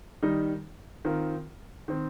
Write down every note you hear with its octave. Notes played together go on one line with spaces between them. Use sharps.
D#3 G3 D#4
D#3 C4 F4 A#4
D#3 C4